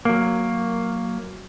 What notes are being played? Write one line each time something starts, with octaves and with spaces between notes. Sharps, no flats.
F#3 A#3